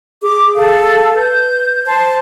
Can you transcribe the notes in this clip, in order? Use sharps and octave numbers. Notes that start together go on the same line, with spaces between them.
G#4 D6
A4 F5
B4 G6
C5 A5